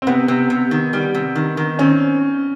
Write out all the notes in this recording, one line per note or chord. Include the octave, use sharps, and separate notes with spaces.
C4
C3 B3
C3
C3
D#3
G3
C3
D#3
D#3
C4 C#4